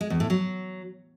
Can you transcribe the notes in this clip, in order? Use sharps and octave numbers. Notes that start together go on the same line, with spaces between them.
G#3
E2
A2
F#3